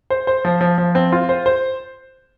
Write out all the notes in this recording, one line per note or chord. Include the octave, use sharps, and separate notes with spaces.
C5
C5
F3
F3
F3
C4
F4
C5
C5